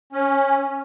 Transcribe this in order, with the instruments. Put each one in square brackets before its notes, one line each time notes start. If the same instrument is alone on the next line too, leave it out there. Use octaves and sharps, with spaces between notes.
[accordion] C#4